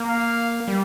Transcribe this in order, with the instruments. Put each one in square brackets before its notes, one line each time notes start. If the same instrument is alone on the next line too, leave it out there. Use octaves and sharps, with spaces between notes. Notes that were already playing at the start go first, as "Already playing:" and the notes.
Already playing: [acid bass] A#3
[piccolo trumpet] F5
[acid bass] G3